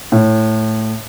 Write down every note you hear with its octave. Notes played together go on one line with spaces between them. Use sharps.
A2